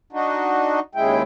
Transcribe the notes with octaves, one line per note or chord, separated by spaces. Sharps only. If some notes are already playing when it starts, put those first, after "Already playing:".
D4 D#4 F#4
D#2 C#3 G#3 E4 G5